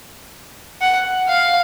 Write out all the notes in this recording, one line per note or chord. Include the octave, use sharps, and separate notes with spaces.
F#5
F5